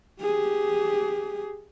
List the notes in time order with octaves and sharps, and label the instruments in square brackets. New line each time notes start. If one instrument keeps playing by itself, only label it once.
[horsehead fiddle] G4 G#4